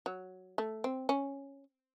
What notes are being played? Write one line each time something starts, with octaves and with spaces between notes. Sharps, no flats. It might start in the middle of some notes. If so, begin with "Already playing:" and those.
F#3
A3
C4
C#4